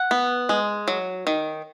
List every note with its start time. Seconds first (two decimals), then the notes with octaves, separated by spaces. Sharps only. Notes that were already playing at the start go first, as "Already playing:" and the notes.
Already playing: F#5
0.11 B3
0.49 G#3
0.88 F#3
1.27 D#3